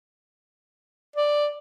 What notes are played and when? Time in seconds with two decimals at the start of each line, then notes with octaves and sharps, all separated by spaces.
1.16 D5